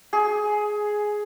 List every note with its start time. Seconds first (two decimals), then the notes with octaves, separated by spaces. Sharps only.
0.13 G#4